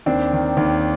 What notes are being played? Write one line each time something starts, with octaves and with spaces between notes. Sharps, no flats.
D#2 C4 D4
D#3
D#2